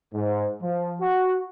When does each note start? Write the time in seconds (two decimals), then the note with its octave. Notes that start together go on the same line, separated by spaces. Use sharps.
0.14 G#2
0.62 F3
1.01 F#4